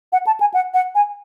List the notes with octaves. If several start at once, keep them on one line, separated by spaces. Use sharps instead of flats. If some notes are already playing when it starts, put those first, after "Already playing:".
F#5
A5
G#5
F#5
F#5
G#5